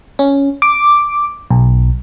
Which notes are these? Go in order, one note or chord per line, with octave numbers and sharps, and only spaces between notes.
C#4
D6
B1